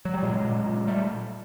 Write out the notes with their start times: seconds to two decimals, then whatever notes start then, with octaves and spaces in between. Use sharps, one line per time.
0.05 F#3
0.14 G3
0.23 A#2 F#3 G#3
0.45 A#2
0.66 A#2
0.87 G3 A3